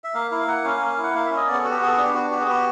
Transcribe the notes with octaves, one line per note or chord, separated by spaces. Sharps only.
E5
A#3 F5
E4 F5
A#3 F#5
C#4 F5
A#3
E4
F#5
A#3 F5
C#4 E5
D#5
B3 D5
G#4
A4
F#4
G4
B3 G#4
A4
G#4
D4
G4
B3 F#4
F#4 G4
G#4
B3 G4